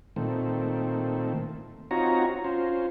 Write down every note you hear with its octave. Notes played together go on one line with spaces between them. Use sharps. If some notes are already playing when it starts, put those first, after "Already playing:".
A#2 D#3 A3 C4
C4 D#4 F4 F#4 C#5 A#5
C#4 F4 C5